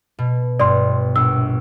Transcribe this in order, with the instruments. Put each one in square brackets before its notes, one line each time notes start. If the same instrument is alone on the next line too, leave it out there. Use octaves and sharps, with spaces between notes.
[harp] B2
[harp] G1 [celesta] D5 C6
[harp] A#1 [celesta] E6